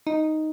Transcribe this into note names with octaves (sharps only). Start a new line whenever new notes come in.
D#4